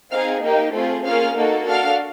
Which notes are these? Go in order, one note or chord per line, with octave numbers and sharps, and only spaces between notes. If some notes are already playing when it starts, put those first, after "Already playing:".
C4 D#4 G#4 F5 F6
A#3 D#4 G4
A3 C4 F4 G#4
A#3 C#4 F4 G#4 F5 F6
A#3 D#4 F#4 A4
D4 F#4 A4 F5 F6